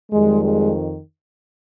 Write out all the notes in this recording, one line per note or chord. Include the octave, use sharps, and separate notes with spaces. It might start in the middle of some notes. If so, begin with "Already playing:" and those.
F2 D#3 G3 G#3
G#3